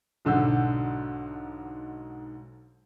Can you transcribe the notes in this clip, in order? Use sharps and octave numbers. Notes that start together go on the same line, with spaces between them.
B1 G#2 D3 F#4 E6 G6